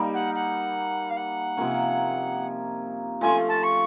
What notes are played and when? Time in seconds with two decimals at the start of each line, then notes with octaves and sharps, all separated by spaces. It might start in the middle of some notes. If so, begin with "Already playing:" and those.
Already playing: G3 A#3 D#4
0.14 F#5
0.34 F#5
1.09 F5
1.16 F#5
1.57 C3 F3 A#3 C#4
3.21 F3 A3 C#4 F4 G#5
3.48 A5
3.63 C#6